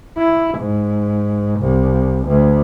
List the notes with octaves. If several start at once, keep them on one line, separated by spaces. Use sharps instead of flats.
E4
G#2
C2
D2